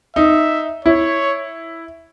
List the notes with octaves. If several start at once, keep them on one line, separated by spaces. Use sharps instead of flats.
D#4 E5
E4 C#5